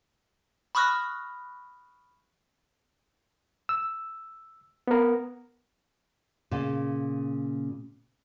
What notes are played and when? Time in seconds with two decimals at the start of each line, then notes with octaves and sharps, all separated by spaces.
0.75 B5 C#6 D#6 F6 F#6 A#6
3.69 E6
4.88 B3 A#4
6.51 A#2 C#3